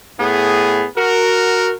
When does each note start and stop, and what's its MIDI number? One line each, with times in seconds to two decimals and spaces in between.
0.19 0.85 45
0.19 0.85 59
0.19 0.85 68
0.97 1.72 66
0.97 1.72 70